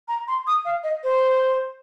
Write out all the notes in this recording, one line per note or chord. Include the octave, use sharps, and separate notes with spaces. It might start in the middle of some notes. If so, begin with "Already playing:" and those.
A#5
C6
D#6
F5
D#5
C5